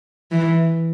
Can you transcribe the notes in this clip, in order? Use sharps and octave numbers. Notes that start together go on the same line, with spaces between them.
E3